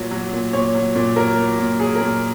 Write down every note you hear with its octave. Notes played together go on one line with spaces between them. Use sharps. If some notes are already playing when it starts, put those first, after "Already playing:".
Already playing: A#2 F#3
F#3
A#2
A#2 C#5
F#3
A#2
F#3 A#4
F#3
A#2
F#3 G#4
A#4
A#2